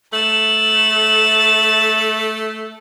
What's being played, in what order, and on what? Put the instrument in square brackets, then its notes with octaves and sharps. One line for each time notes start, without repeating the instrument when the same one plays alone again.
[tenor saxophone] A3 [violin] A6 E7 [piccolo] F#7